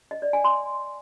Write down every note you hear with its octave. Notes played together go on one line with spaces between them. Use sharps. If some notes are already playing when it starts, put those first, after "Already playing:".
D#5
D5
G#5
C6